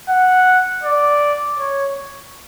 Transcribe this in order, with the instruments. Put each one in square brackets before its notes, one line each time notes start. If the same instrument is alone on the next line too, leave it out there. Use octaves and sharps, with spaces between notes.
[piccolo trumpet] F#5
D5
C#5